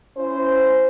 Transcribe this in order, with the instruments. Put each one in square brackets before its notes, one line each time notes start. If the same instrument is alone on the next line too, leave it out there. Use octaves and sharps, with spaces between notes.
[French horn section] C#4 E4 C5